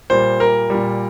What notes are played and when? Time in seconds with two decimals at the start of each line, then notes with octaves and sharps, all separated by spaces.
0.10 A#2 G3 C5
0.40 A#4
0.70 A#2 G3